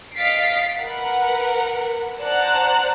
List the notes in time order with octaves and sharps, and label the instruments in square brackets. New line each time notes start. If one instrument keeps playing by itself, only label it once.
[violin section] D#5 F5 A6 B6 C7 D7
A#4 B4 F#5
C5 D5 F#5 A5 A#5 F#6